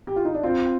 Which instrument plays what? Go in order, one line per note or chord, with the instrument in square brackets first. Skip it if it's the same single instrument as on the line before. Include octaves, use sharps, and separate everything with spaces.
[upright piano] G4
F4
D#4
D4
[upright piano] C4 [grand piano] F4